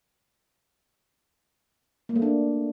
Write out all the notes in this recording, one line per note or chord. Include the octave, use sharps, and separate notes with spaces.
A#3
A3
D4